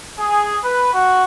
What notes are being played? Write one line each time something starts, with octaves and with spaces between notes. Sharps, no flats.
G#4
B4
F#4